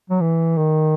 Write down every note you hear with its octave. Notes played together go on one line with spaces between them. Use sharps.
F#3
E3
D#3